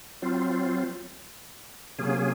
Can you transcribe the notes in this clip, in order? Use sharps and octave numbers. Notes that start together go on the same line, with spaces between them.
F#3 C4 F4
C3 F#3 A#3 C#4 G#4